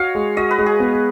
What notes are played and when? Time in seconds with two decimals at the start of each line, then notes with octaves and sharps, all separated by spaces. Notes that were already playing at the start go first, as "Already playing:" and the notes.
Already playing: F#4 C#5 D#5 F5
0.15 G#3
0.37 F#4 D#5
0.51 B4
0.58 G#3
0.66 G#4
0.80 B3